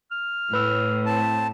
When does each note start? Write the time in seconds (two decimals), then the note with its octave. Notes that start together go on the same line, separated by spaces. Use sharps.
0.12 F6
0.54 A2 B4 E6
1.06 C4 A5